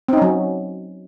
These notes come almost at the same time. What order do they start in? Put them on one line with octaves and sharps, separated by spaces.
C4 D#4 C#4 F#3